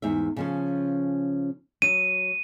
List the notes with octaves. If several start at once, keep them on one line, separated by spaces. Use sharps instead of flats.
E2 G#2 E5
C#3 F3 C#4
F#3 D#7